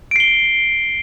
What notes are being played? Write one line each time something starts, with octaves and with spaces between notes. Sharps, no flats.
C7 D7 G7